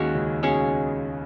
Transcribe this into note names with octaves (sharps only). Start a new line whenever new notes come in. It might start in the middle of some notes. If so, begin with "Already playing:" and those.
Already playing: D#2 D#3 G#3 A#3 C#4 F#4 C#5
C#2 C#3
B2 G#3 C#4 G#4 C#5